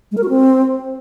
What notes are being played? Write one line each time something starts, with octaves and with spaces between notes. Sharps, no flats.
G#3
A#4
F#4
C4